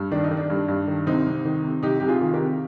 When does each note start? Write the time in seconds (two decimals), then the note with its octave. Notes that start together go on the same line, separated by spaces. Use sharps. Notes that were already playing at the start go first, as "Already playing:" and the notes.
Already playing: G2
0.11 D#3 D4
0.24 D#4
0.31 D#3
0.37 D4
0.50 G2
0.68 G2
0.88 D#3
1.07 C2 C4 D#4
1.26 C2
1.45 D#3
1.64 C3
1.83 C2 D#4 G4
2.00 C2 G4
2.08 F4 G#4
2.22 D#3
2.34 G4 A#4
2.40 C3